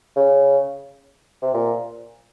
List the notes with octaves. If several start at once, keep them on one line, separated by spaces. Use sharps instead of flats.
C#3
C3
A#2